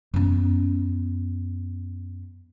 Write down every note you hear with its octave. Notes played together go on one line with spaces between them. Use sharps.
F#2 B3